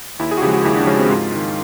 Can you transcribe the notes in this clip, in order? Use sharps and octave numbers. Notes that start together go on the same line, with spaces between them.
D#2 E4
G#4
F#4
C#3 F3 G#3 G4
F#4
D#2 E4
D4
C#3 F3 G#3 C#4
C4
G#2 F4
D#3 G#3